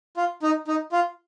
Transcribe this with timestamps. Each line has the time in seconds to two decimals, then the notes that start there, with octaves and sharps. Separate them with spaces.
0.17 F4
0.43 D#4
0.68 D#4
0.92 F4